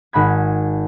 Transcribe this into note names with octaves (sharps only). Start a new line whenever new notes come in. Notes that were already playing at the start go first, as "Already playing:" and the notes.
G#1 F#5 B5 G#6